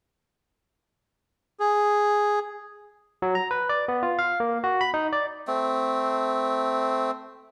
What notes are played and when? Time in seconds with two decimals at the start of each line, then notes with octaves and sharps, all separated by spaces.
1.60 G#4
3.22 F#3
3.35 A#5
3.51 B4
3.69 D5
3.88 B3
4.03 F4
4.19 F5
4.40 A#3
4.64 F#4
4.81 B5
4.94 D#4
5.13 D5
5.47 A3 C4